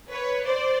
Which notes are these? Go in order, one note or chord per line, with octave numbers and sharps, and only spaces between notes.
B4 C#5
C5 D5